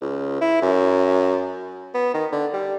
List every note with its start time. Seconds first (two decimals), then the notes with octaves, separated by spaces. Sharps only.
0.01 C#2
0.41 E4
0.62 F#2
1.94 B3
2.14 D#3
2.32 D3
2.53 G3